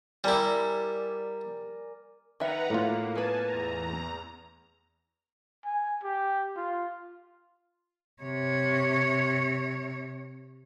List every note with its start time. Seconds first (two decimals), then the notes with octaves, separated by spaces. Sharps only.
0.24 G3 E4 A#4 D5 G#5
2.40 D#3 B4 E5 F#5 A#5
2.70 A2 A#3 F4
3.15 B3 B4 G#5 A5
3.48 E2 A#5
5.65 G#5
6.03 G4
6.57 F4
8.22 C3 C#5